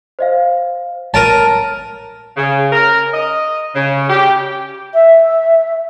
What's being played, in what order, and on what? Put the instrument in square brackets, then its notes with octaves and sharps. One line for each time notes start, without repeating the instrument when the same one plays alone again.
[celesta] C5 D#5 F5
[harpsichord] A#4 A5 [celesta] C#5 D7 D#7
[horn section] C#3
A#4
D#5
C#3
G4
[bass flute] E5